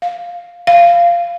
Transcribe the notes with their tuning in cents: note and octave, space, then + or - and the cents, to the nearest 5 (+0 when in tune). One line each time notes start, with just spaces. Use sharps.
F5 +10
F5 -10